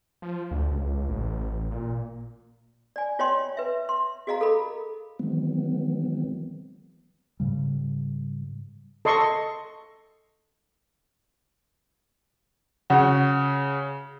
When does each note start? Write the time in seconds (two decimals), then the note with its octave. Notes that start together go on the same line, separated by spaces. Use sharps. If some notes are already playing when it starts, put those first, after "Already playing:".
0.22 F3
0.51 D2
0.72 C#2
1.09 A1
1.71 A#2
2.96 D5 G#5
3.19 F4 C#5 D#5 G5 C6
3.57 B4 E5
3.89 C6
4.27 F#4 G#4 D#5 F5 A#5
4.41 A4 A#4 B5
5.19 D#3 E3 F#3 G#3 B3 C4
7.40 G#2 C#3 G3
9.05 A4 D#5 C6 C#6
12.90 C#3 F#4